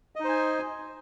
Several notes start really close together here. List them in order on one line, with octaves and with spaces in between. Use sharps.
D#5 D#4 C5 G#5